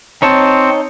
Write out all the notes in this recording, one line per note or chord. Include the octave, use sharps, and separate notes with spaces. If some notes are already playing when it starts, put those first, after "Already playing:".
C4 D#4 C#5 A5